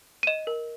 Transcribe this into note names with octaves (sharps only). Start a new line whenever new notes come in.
D#7
D#5 E7
A#4